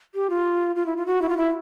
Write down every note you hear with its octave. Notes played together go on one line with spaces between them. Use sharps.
G4
F4
F4
E4
F4
F#4
E4
F4
E4